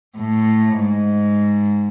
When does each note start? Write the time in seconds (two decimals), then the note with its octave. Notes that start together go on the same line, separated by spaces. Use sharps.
0.18 A2
0.79 G#2